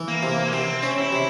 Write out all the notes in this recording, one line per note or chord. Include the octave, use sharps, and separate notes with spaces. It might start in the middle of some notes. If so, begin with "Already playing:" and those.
Already playing: E3
A#3
C3
C3 C4
C#4
E4
C3